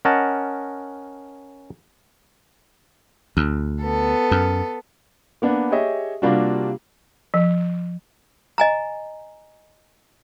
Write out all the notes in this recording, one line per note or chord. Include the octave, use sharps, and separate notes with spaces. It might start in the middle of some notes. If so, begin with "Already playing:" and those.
C#4 A#4 D#5 F#5 A5
D2
B3 A4
F#2
A#3 B3 D4
G4 G#4 C#5 D#5 E5
C3 G3 A#3 D4 F4 F#4
F3
D#5 G#5 A#5